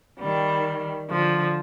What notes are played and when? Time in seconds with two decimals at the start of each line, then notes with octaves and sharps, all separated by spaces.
0.20 D#3 G3
1.10 D3 F3